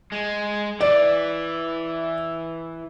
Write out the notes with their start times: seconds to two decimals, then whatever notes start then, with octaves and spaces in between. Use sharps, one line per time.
0.12 G#3
0.81 E3 D5